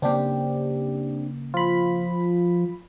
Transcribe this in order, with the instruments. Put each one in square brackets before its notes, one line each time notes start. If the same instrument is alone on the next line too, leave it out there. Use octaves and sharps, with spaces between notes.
[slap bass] C#3 A#3 [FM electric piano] C4 D4 G4
[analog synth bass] F3 [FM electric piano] F4 B5